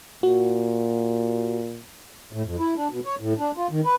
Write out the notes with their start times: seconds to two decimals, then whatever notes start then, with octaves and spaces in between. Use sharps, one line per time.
0.23 A#2 F#4
2.32 A2
2.44 F2
2.59 E4
2.77 D4
2.91 B2
3.05 C#5
3.20 A2
3.39 D4
3.57 F4
3.70 D#3
3.85 B4